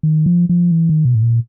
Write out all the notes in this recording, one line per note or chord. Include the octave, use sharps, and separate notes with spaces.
D#3
F3
F3
E3
D#3
B2
A2
A#2